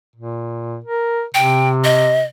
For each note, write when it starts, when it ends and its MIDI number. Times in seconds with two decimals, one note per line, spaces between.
0.16 0.79 46
0.84 1.24 70
1.34 2.30 48
1.34 1.69 79
1.84 2.23 75